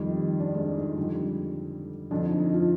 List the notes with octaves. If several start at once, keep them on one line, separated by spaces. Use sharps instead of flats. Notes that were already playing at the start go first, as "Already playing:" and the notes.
Already playing: F2 D#3 G3
D4 D5
G#3 G#4
D#4
D#4
F2 D3 G3
F2 D3 F3 D4
D#4
D#4
F3 F4